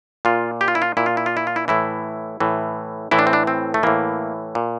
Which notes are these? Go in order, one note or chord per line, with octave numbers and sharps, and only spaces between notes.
A#2 F4
G4
F4
E4
F4
A#2 E4
F4
E4
F4
E4
F4
E4
A2 E3 E4
A2 E3
A2 E3 E4
D4
C4
D4
C4
A3
A2 E3 A#3
A#2